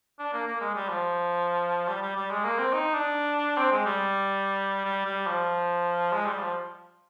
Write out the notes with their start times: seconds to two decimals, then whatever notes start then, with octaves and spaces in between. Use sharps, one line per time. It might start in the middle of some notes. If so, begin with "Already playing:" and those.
0.19 D4
0.33 A#3
0.47 A#3
0.61 G#3
0.75 G3
0.89 F3
1.88 G3
2.02 G3
2.16 G3
2.30 G#3
2.44 A#3
2.58 C4
2.73 D#4
2.94 D4
3.58 C4
3.71 G#3
3.85 G3
4.85 G3
5.05 G3
5.26 F3
6.12 G#3
6.26 G3
6.39 F3